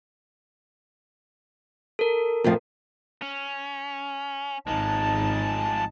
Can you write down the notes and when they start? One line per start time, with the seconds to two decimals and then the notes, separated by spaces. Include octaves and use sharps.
1.99 A4 A#4
2.44 F2 A2 F3
3.22 C#4
4.67 G#1 F3 G#3 D#4 A5